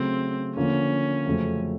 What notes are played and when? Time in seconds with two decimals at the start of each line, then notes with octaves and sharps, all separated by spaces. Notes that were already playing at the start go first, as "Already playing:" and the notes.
Already playing: C#3 F#3 A3 C4
0.56 D3 F3 A#3 C#4
1.26 F2 C#3 F#3 A3 C4